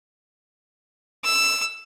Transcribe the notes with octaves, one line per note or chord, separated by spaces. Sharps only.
E6